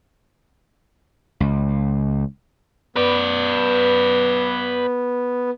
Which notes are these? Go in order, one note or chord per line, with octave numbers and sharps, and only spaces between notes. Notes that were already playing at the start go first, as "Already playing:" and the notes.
C#2
B3 B4 D5